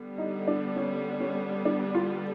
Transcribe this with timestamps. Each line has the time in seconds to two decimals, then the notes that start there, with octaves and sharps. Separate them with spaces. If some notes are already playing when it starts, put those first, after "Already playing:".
Already playing: D3 G3 B3
0.18 D#4
0.47 D4
0.76 C#4
1.20 C#4
1.65 D4
1.95 F4